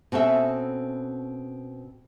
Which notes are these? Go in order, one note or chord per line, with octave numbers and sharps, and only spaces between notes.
B2 C4 C#4 A4 E5